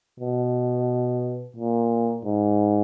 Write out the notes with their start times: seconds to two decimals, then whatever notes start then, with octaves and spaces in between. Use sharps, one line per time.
0.20 B2
1.56 A#2
2.25 G#2